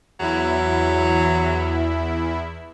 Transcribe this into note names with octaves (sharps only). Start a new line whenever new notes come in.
E2 F#3 E4